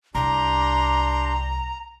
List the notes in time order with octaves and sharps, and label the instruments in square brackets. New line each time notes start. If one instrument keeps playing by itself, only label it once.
[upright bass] C2 [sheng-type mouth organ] D4 G4 C6 [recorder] A#5